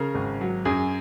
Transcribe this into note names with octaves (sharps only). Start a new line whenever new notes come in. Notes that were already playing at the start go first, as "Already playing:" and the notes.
Already playing: C#3 A#4
G#1
F#3
F#2 G#4